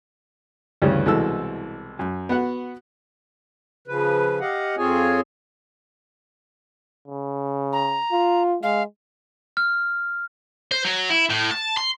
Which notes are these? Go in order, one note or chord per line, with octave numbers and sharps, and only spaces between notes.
D2 G2 C#3 E3 G3 C#4
C2 B2 E3 G#3 A4 E6
F#2
B3 F#4 F#5
C#3 F3 B4
G4 D#5 F5 F#5
F2 C4 F4 G#4 C#5 G#5
C#3
A#5
F4
G#3 F5
F6
C5
F#3
E4
A2
A5
C6